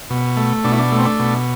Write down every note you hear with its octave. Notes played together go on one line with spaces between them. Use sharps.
B2
A3
B2 D4
E4
D4
A3
C4
D4
B2